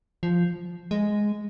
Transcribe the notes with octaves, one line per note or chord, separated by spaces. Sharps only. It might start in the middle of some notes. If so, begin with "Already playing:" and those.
F3
G#3